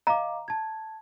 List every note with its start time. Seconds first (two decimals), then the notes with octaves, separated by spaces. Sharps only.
0.07 D#5 F5 A#5 D6
0.48 A5 G#6